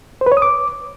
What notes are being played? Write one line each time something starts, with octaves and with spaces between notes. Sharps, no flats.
C5
B4
C#5
D#6
D6